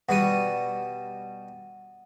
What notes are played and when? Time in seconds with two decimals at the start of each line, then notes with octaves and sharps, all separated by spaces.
0.09 B2 G3 F#4 F#5 D#7